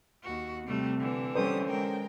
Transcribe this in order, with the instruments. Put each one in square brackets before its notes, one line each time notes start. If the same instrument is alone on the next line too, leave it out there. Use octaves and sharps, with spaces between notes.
[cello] D#2 F#4
[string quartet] C3 [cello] G3 A3
[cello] D3 E3
[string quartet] G3 D#6 [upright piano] C#4 A4 C5
[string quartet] G#3 A#4 G5